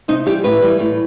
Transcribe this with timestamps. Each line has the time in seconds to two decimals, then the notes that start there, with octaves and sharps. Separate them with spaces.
0.08 C3 D#4
0.26 E3 G3 G4
0.44 A2 B4
0.62 E3 G3
0.79 A2